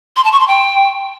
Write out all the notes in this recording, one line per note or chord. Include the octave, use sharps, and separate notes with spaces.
C6
A5
C#6
C6
G5